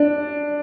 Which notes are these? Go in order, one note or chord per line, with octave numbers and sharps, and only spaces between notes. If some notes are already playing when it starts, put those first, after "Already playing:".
Already playing: D4